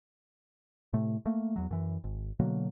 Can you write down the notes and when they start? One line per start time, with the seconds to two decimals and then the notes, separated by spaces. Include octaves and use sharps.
0.93 A2 C3 A3
1.26 A3 A#3
1.56 E2 F#3
1.71 F#2 E3
2.04 G#1
2.40 B2 D3 F#3 A#3